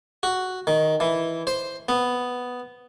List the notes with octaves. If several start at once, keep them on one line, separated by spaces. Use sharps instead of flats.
F#4
D#3
E3
C5
B3